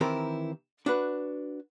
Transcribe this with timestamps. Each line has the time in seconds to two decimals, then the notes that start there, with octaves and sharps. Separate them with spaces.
0.01 D#3 E3 C4 E4 G4 A#4
0.86 D4 F#4 B4